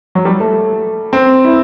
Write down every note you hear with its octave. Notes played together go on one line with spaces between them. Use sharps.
F#3
G3
A3
C4
E4